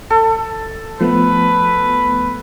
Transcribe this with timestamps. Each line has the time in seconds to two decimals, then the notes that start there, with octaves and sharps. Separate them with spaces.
0.10 A4
1.01 F3 A3 B3 B4